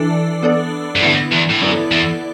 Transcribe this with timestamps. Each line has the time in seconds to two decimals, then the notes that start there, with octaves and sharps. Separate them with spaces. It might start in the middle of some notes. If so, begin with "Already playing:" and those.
Already playing: E3 D4 A4 D5
0.43 B3 D4 A4 D5
0.96 F#2
1.02 A2 D3 B3 E4
1.32 E2
1.50 A2
1.62 F#2 B3 E4 A4 D5
1.92 E2